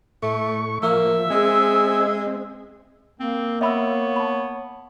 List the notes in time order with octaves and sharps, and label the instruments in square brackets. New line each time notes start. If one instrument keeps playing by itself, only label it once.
[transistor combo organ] A2 C#6 [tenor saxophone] A3
[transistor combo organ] F3 [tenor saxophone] A#3 [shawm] E5
[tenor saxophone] G#3 [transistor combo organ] C4 G#4
[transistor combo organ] C4
[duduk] A#3 [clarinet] C4
[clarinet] B3 [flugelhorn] C#5 [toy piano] E5 B5 E6
[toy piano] A5 B5